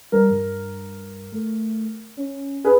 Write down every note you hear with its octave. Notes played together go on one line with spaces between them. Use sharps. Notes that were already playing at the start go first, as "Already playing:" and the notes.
G3 A#4
G2
A3
C#4
G#4 B4